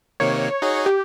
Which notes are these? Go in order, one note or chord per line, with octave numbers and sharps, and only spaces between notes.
C3 D#3 A#3 C#5
D#4 F#4 G#4
G4